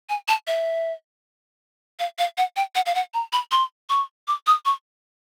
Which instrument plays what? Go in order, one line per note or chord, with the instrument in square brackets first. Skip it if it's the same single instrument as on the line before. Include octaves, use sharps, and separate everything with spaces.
[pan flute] G#5
A5
E5
F5
F5
F#5
G5
F#5
F5
F#5
A#5
B5
C6
C#6
D6
D#6
C#6